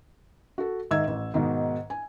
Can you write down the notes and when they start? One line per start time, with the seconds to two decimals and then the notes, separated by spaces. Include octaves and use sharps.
0.58 F#4 A4
0.91 G#2 D#3 E5 E6 G#6
1.07 A1
1.34 G#2 B2 D#3
1.90 G#5